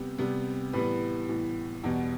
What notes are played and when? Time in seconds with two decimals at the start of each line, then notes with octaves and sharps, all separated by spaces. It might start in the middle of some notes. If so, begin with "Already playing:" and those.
Already playing: C3 G3 B3 G4
0.18 C3 G3 B3
0.73 A2 E3 G3 B3 B4
1.29 A2 E3 G3 B3
1.84 E2 B2 G3 B3